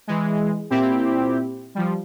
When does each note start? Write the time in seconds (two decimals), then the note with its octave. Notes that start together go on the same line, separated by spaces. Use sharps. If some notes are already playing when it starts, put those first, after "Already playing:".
0.07 E3 G#3
0.70 A#2 C4 E4 G4
1.75 F3 G3